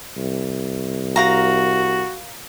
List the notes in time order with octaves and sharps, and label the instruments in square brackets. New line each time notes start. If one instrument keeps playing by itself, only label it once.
[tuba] C2
[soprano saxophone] F#4 [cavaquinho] A#4 F5 A#5